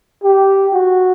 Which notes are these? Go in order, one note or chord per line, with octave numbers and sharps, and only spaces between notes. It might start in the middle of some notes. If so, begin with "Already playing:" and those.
G4
F#4